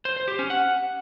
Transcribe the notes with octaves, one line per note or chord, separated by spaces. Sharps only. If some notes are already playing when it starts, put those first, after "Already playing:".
C5
C5
G4
C#4
F#5